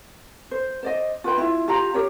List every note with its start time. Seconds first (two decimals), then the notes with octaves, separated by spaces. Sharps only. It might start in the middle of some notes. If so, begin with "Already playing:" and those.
0.51 C5
0.83 C5 D5 D#5
1.24 F4 B4 G5
1.38 E4 F4
1.68 F4 G4 F5 A#5
1.94 G4 A#4 C#5